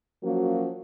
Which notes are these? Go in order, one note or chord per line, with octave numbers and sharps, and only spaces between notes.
F3 F#3 A#3 C#4 F#4